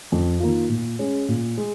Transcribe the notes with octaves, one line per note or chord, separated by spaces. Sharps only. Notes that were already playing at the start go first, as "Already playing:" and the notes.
F2
D#3 A#3 F4
A#2
G#3 C#4
A#2
G#3